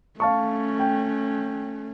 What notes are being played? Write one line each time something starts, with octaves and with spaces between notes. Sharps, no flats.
A3 C#4 F5 A5 C#6
G5